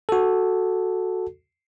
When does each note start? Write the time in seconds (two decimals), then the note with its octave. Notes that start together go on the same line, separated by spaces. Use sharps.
0.09 F#4 A4